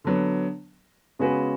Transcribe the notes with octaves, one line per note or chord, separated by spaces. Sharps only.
D3 F#3 B3
C#3 G#3 B3 F#4 B4